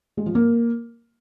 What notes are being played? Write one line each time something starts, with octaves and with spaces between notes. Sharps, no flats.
G#3
F3
A#3